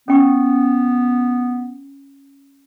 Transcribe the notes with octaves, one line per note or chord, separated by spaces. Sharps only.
B3 C#4 G5 C#6